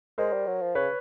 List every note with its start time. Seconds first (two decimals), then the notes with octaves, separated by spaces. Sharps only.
0.18 G#3 A#4 C5
0.33 G3
0.47 F#3
0.62 F3
0.75 C#3 B4 C#5